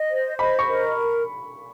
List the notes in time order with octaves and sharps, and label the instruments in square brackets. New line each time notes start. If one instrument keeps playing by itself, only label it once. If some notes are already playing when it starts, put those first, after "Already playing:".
Already playing: [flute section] D#5
C5
[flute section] D#5 [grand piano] B5
[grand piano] C#6
[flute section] A#4